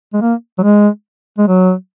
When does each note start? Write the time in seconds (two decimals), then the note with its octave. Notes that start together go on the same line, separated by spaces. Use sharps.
0.13 G#3
0.21 A#3
0.58 F#3
0.63 G#3
1.38 G#3
1.48 F#3